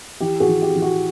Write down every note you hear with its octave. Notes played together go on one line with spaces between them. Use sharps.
E3 G4
F#4 G#4
E3
G4
E3
F#4